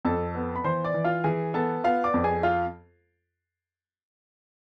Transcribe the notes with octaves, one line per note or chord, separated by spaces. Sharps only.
F2 A4 A5
B3
B5
E3 C5 C6
D5 D6
E3
F4 F5
E3 G#4 G#5
B3 A4 A5
B3 F4 F5
D5 D6
F2
G#4 G#5
F4 F5